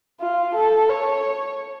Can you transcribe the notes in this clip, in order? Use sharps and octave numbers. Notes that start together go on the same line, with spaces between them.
F4
A4
C#5